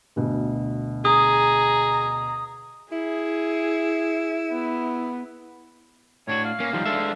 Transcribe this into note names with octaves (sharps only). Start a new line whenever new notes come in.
D2 B2
G#4 A#5 D#6
E4 G#4
B3
A2 D4 F#4 C#5
F5
A#3 C#4
G#2 D#3 F3 G3
G#3 D4 A4 E5